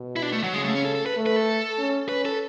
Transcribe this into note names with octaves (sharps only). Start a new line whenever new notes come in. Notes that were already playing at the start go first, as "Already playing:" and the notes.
Already playing: B2
E4
D4
A3
F#3
C#3 G#3
A3
C#4
A4
A4
B4
A3
B4
A4
C#4
C#4 B4
A4